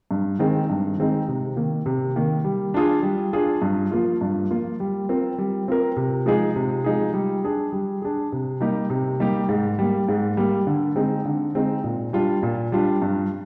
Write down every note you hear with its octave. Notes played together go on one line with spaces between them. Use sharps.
G2
D#3 G#3 C4 D#4
G2
D#3 G#3 C4 D#4
C3
D#3 A#3
C3
D#3 A#3
G3
D4 F4 G#4
G3
D4 F4 G#4
G2
F3 A#3 F4
G2
F3 A#3 F4
G3
C4 F4 A#4
G3
C4 F4 A#4
C3
F3 G#3 D#4 G#4
C3
F3 G#3 D#4 G#4
G3
D4 G#4
G3
D4 G#4
C3
G3 A#3 D#4 G4
C3
G3 A#3 D#4 G4
G#2
G3 A#3
G#2
G3 A#3
D3
G#3 C4 D#4
D3
G#3 C4 D#4
A#2
G3 D4 F4
A#2
G3 D4 F4
G2